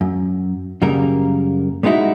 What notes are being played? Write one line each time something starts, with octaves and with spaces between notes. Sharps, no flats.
F#2
F#2 C#3 G3 A#3 A#4
G3 G#3 B3 D#4 E4 F#4